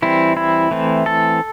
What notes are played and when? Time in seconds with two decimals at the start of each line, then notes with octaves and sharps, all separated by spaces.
0.02 E3 G3 C4 E4
0.37 E4
0.71 E3 A3 C4
1.06 A4